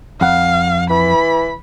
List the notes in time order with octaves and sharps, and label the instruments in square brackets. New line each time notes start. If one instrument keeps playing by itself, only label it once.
[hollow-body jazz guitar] F2 F#5 [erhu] F5
[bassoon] E3 [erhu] B5